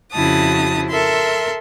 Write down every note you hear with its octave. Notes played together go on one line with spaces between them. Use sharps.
F2 C#3 E4 F#4 A5 D#6
A4 A#4 E5 C6